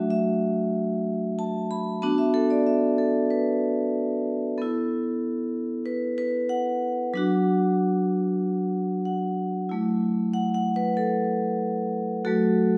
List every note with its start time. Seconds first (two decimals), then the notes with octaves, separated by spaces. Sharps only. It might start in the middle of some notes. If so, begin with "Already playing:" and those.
Already playing: F#3 A3 D4 F#4 E5
0.10 E5
1.39 A5
1.71 B5
2.02 B3 D4 F#4 A5
2.18 E5
2.34 A4
2.50 D5
2.67 E5
2.98 A4
3.30 B4
4.58 B3 E4 A4
5.86 B4
6.18 B4
6.49 F#5
7.14 F#3 D4 F#4
9.05 F#5
9.69 F#3 A3 E4
10.33 F#5
10.54 F#5
10.76 B4
10.97 A4
12.25 F#3 A3 F#4 A4